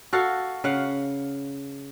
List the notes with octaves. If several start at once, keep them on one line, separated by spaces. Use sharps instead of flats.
F#4 A4 F5
C#3 F5 F#5